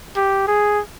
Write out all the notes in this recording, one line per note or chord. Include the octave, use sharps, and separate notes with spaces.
G4
G#4